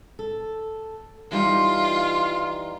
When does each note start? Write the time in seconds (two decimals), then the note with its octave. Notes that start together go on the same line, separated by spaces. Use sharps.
0.19 A4
1.32 E3 G3 D#4 F4